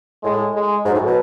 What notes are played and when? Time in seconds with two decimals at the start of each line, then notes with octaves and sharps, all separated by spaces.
0.23 A2 G#3
0.54 G#3
0.85 G#2 F#3
0.95 A2
1.06 B2